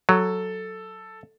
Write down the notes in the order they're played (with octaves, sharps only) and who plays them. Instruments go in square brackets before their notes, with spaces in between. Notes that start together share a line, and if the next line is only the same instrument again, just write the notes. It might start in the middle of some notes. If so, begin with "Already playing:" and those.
[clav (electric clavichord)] F#3 [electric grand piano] A4